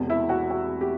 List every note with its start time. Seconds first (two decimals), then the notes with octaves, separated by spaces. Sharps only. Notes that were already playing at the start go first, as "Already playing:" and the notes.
Already playing: E1 E2 C3
0.10 E4
0.29 F#4
0.50 F#4
0.81 G4